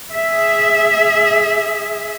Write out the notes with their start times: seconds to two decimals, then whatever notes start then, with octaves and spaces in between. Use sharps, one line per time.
0.12 G#4 E5